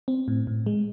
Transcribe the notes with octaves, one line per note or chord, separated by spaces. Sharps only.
C4
A2
A2
G#3